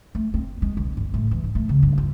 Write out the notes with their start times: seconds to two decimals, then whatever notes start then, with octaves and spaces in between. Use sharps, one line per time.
0.15 A3
0.34 C4
0.62 G#3
0.77 B1
0.97 G1
1.14 A2
1.31 E3
1.43 G#2
1.55 A3
1.69 C#3
1.83 G2
1.98 F4